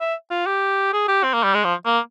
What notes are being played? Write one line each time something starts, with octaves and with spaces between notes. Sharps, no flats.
E5
F4
G4
G#4
G4
C4
A#3
G3
G#3
F3
A#3